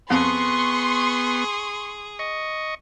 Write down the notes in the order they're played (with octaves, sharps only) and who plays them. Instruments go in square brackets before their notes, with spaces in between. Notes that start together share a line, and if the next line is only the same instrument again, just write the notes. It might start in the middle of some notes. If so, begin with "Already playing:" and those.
[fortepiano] F2 [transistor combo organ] B3 [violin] G#4 [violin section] C6 C#6
[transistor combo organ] D#5 C#6